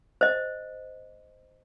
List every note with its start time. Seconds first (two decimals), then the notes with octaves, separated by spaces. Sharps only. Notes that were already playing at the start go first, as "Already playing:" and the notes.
0.21 C5 D#5